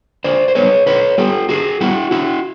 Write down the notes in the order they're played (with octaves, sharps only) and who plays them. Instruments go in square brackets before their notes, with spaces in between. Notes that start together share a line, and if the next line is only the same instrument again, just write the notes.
[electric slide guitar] D3 C5 D5
C5
G3 B3 B4 C#5
D3 B4 C#5
G3 B3 G4 A4
D3 F#4 G#4
G3 B3 E4 F#4
D3 E4 F#4